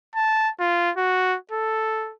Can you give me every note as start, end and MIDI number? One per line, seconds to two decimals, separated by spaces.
0.16 0.50 81
0.60 0.91 65
0.98 1.37 66
1.51 2.13 69